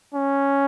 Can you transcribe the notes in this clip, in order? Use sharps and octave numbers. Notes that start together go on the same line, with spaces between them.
C#4